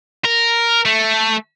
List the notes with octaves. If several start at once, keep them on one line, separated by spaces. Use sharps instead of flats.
A#4
A3